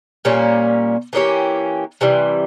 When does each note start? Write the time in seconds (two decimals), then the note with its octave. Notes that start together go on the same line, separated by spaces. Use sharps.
0.25 A#2 G3 A#3 C#4
1.13 E3 A#3 C#4 G4
2.01 C3 E3 G3